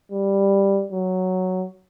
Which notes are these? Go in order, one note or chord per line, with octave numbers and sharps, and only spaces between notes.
G3
F#3